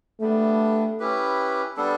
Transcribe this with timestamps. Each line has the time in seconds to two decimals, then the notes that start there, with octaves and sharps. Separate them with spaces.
0.21 G3 A3 B3 D4
1.00 C#4 E4 G4 B4
1.77 G3 B3 D4 A4